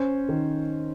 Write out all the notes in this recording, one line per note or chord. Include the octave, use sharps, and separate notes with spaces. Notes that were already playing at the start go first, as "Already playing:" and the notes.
Already playing: C#4 C5
D#3